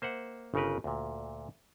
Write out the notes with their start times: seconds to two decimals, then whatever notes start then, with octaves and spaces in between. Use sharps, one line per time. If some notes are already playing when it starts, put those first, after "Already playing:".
0.02 A#3 C5 E5 F#5
0.54 G1 C#3 D#4 A#4 B4
0.84 D2 A#2